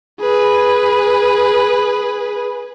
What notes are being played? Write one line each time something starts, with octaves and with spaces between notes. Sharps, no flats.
G#4 B4